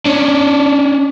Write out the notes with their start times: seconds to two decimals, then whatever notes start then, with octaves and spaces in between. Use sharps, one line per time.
0.05 C#4 D4